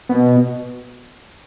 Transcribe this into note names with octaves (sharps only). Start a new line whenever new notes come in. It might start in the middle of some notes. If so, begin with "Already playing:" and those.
B2